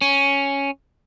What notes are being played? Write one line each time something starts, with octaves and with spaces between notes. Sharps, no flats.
C#4